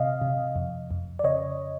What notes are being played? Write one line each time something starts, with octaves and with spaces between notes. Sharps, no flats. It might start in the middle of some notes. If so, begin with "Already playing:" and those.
Already playing: C3 D#5 F5
C3
F2
F2
D5
C#3 C#5 D#5